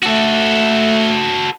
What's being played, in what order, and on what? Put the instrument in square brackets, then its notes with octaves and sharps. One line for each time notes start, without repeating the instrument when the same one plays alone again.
[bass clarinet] A3 [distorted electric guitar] F#4 A4